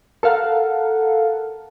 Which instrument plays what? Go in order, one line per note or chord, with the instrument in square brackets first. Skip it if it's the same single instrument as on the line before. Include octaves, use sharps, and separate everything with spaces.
[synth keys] A4 A#4 F5 F#5